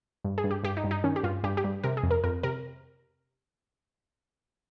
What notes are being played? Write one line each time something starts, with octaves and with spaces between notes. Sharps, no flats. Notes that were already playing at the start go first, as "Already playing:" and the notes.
G2
G#4
G2
G4
G2 G4
D#4
G2
D#4
D#3 C#4
G4
G2 F4
G2 G4
G4
G2
C3 A#4
G#4
F2
A#4
F2 A#4
C3 A#4